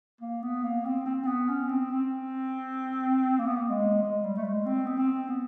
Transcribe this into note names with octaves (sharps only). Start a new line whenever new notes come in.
A#3
B3
A#3
C4
C4
C4
B3
C#4
C4
C4
A#3
B3
A#3
G#3
G#3
G3
A3
G#3
C4
B3
C4
B3